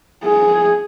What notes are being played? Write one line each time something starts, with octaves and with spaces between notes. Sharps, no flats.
G#4